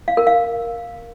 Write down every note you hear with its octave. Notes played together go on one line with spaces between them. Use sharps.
F5
A#4
F5